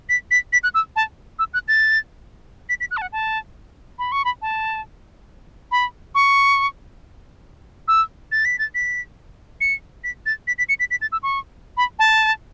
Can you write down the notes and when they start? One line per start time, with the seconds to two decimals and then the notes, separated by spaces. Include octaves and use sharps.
0.09 B6
0.31 B6
0.53 B6
0.63 F#6
0.74 E6
0.96 A5
1.39 E6
1.54 F#6
1.68 A6
2.69 B6
2.80 B6
2.91 F#6
2.97 A5
3.02 F#5
3.12 A5
3.99 B5
4.12 C#6
4.25 B5
4.42 A5
5.71 B5
6.15 C#6
7.88 E6
8.32 A6
8.45 B6
8.59 A6
8.75 B6
9.61 C#7
10.04 B6
10.26 A6
10.47 B6
10.58 B6
10.69 C#7
10.79 B6
10.91 B6
11.01 A6
11.12 E6
11.23 C#6
11.77 B5
11.99 A5